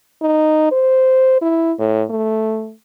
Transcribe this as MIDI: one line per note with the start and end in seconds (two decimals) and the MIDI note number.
0.22 0.71 63
0.72 1.40 72
1.41 1.72 64
1.79 2.04 45
2.10 2.73 57